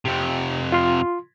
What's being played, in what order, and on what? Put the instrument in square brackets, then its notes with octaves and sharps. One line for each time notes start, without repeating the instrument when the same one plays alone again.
[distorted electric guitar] F2 C3
[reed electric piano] F4 C6